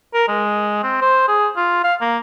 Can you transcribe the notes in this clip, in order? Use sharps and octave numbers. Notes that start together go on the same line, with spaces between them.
A#4
G#3
C4
C5
G#4
F4
F5
A#3